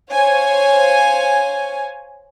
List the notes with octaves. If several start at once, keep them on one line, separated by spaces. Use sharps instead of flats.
C5 C#5 F5 G#5